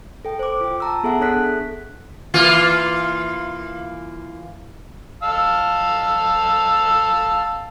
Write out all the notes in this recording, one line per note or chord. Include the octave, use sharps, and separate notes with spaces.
A4 G5
C5 D6
F4 G5
A5 A#5 E6
B3 G#4 A4 E5 F#5 A5
D4 G#4 A4 C#5 F#6 B6
E3 A#3 F4
F5 A5 E6